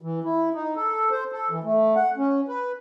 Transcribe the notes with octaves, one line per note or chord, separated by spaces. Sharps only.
E3
E4
D#4
A4
C5
A4
E3
A3
F#5
C#4
B4